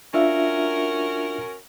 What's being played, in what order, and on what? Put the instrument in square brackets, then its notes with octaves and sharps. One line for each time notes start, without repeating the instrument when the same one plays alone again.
[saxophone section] C#4 F#4 A#4 [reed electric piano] D4 F4 E5